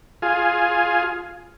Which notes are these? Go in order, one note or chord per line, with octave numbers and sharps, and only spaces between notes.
F4 G#4